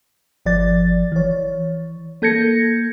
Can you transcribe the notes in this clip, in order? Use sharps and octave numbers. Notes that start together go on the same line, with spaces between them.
G1 F3 D5 A6
E3 C#5
A#3 A4 G6 G#6 A#6 C#7